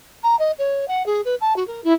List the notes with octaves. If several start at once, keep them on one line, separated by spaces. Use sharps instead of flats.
A#5
D#5
C#5
F#5
G#4
B4
A5
F#4
A#4
E4